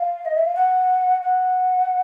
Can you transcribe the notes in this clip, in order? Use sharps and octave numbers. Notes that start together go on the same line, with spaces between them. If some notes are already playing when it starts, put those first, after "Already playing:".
Already playing: F5
D#5
E5
F5
F#5
F#5